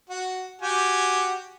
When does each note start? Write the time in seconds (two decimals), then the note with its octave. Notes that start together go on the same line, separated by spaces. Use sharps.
0.09 F#4
0.62 F#4 G4 G#5